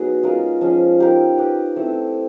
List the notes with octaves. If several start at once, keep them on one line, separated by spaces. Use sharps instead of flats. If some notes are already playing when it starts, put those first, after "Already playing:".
Already playing: F#3 B3 D#4 F#4 G#4
G#3 C#4 F4 A#4
F3 G#3 C#4
D#4 G4 A#4
D#4 G4 B4
A3 C4 E4 A4